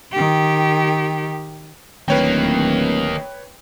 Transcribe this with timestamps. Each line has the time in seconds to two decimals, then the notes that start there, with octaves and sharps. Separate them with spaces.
0.12 D#3 G4
2.08 D1 D#3 A#3 B4 C#5 G5